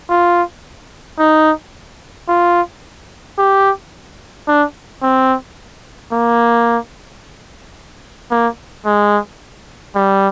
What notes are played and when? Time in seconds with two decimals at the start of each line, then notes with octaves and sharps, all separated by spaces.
0.10 F4
1.19 D#4
2.29 F4
3.38 G4
4.48 D4
5.03 C4
6.12 A#3
8.31 A#3
8.86 G#3
9.95 G3